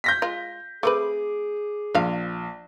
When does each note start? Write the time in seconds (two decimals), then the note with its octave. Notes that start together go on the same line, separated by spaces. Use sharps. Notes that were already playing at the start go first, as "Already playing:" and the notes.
0.04 G6 A#6 B6
0.22 G#3 F4
0.83 A3 C4 G#4 B4 D6
1.95 A#1 F4 F5